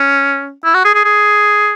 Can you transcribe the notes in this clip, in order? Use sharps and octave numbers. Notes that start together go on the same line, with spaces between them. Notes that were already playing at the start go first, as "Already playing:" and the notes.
Already playing: C#4
E4
F#4
G#4
G#4
G#4